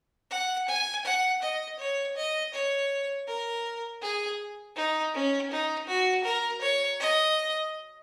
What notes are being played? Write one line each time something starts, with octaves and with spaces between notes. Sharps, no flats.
F#5
G#5
F#5
D#5
C#5
D#5
C#5
A#4
G#4
D#4
C#4
D#4
F#4
A#4
C#5
D#5